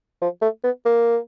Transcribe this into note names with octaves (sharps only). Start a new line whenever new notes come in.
F3
A3
B3
A#3